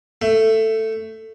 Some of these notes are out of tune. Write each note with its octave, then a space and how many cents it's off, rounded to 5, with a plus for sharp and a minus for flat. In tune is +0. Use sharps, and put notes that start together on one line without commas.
A3 +10 E5 +20